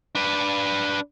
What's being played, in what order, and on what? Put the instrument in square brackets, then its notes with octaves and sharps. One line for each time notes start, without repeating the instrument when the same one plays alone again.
[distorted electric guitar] D4 B4